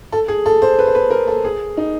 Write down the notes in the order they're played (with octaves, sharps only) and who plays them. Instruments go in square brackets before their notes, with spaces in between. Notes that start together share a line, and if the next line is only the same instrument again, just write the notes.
[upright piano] A4
G#4
A4
C5
B4
C5
B4
A#4
A4
G#4
D#4